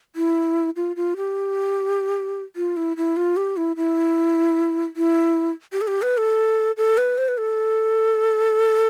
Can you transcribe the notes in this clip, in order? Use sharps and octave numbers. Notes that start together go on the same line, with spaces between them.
E4
F4
F4
G4
F4
E4
E4
F4
G4
E4
E4
E4
G4
A4
G4
B4
A4
A4
B4
C5
B4
A4